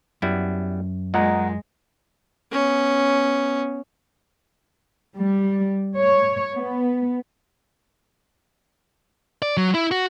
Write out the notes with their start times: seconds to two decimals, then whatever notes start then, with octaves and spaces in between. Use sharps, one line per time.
0.22 F#2 G3 B3 E4
1.14 A#2 G#3 D#5 F#5 A#5
2.52 B3 C#4
5.15 G3
5.95 C#5
6.55 B3
9.42 D5
9.57 F#3
9.74 E4
9.91 F#4